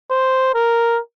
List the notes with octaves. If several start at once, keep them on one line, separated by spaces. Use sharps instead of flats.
C5
A#4